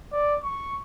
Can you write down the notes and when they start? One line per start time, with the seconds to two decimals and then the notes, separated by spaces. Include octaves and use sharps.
0.12 D5
0.44 C#6